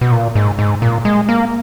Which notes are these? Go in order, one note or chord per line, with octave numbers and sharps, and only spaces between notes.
B2
A#2
G#2
G#2
A#2
G#3
A#3